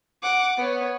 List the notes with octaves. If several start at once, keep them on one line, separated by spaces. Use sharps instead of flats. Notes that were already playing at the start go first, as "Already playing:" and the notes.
F#5 D6
B3 C#5